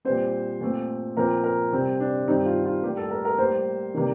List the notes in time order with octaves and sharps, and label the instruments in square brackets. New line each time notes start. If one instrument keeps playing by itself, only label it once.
[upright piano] A#2 G3 C4 C5
A#2 A3 C4
A#2 F3 C4 A#4
A#4
C3 G3 C4
D4
G2 D#3 G3 C4 D#4
F4
F4
A2 G3 A#3 G4
A4
A#4
A#4
A2 G3 A#3 C5
C3 D#3 G3 A#3